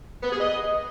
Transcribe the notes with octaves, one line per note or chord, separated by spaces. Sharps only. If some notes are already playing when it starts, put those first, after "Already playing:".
B3
G#4
D#5